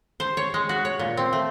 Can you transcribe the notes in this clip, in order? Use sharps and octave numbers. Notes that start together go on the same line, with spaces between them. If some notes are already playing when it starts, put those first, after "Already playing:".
C5
C#5
G#3
F#4
C#5
A#2
C4
A3